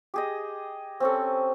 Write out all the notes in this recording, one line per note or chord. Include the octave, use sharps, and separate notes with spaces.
G4 G#4 D#5
C4 C#4 A4